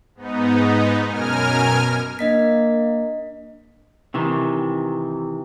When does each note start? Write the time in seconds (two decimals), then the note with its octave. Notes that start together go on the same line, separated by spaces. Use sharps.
0.15 G#2 B3 D#4
1.07 F#2 B2 A#4 G#5 F6
2.19 A#3 D4 D#5 B6
4.14 C3 D#3 E3